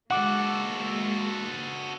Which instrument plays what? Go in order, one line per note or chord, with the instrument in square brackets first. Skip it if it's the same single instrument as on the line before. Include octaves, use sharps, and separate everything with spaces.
[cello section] G#3 A#3 [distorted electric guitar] F#4 A4 [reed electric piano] F#5 D6